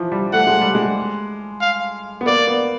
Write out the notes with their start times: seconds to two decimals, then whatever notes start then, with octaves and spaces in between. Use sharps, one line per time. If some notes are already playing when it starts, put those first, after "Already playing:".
Already playing: E3 F3
0.12 G3
0.33 A3 F#5
0.47 G#3
0.61 G3
0.75 G#3
1.61 F5
2.21 B3
2.26 A#3 D5
2.47 B3